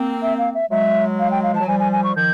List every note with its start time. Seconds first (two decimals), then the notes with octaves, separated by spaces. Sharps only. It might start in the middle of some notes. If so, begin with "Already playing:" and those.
Already playing: A#3 C4
0.22 E5
0.38 F5
0.55 E5
0.71 F#3 G#3 E5
1.19 F5
1.31 G5
1.43 F5
1.53 F3 A5
1.61 F#3
1.68 F3 G3 G#5
1.80 G#5
1.92 G#5
2.04 C#6
2.16 D#3 F3 G6